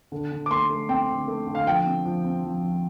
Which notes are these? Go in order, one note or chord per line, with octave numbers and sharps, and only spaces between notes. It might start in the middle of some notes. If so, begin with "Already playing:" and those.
D3
D3
D6
A3 C6
A3
C4 G5
D3
A3
D3
F5
F3 G5
C4
F3
C4
F3
F3